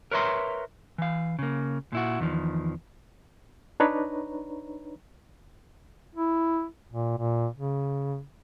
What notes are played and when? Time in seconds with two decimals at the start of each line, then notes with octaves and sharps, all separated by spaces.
0.11 A#4 B4 C#5 E5 A#5 C6
0.98 E3 F5
1.39 C#3 A#3
1.92 A#2 E4 F#4
2.20 E2 D#3 F3
3.80 D4 D#4 B4 C#5 A#5
6.15 E4
6.91 A#2
7.17 A#2
7.56 C#3